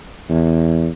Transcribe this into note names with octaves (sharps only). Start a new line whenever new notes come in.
E2